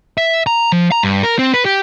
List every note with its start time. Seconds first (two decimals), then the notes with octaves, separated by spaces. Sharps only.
0.18 E5
0.47 A#5
0.72 F3
0.92 A#5
1.03 G2
1.23 A#4
1.39 C4
1.54 B4
1.66 G4